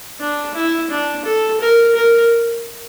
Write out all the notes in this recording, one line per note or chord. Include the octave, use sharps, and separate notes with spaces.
D4
E4
D4
A4
A#4
A#4